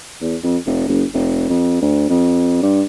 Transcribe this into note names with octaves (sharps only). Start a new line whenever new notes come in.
E2
F2
F1
F#1
F1
F2
D2
F2
G2